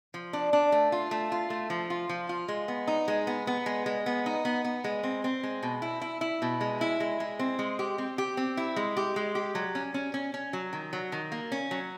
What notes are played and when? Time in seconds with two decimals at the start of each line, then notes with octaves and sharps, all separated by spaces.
0.14 F3
0.33 D4
0.53 D4
0.72 A3
0.92 F4
1.11 A3
1.32 F4
1.50 A3
1.70 F3
1.90 F4
2.09 F3
2.29 F4
2.48 G#3
2.68 B3
2.87 D#4
3.08 G#3
3.27 B3
3.47 B3
3.66 G#3
3.86 G#3
4.06 B3
4.26 D#4
4.45 B3
4.64 B3
4.84 G#3
5.03 C4
5.24 C4
5.43 G#3
5.63 B2
5.82 E4
6.02 E4
6.21 E4
6.42 B2
6.61 G#3
6.81 E4
7.00 G#3
7.20 G#3
7.39 C4
7.59 G#3
7.79 G4
7.98 C4
8.18 G4
8.37 C4
8.57 E4
8.76 G#3
8.97 G4
9.16 G#3
9.35 G4
9.55 F#3
9.75 C#4
9.94 C#4
10.14 C#4
10.34 C#4
10.53 F#3
10.73 D#3
10.93 F#3
11.12 D#3
11.32 A#3
11.52 C#4
11.71 F#3